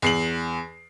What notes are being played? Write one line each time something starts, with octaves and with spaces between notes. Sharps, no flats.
E2 C7 F#7